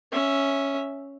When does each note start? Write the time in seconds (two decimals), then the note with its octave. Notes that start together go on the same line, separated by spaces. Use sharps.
0.12 C#4 E5